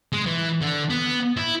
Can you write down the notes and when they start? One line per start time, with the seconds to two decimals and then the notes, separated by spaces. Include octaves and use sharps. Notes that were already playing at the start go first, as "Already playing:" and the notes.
0.13 G#3
0.26 E3
0.62 D3
0.90 B3
1.37 E4